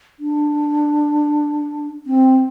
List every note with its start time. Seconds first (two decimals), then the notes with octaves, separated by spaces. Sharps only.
0.20 D4
2.07 C4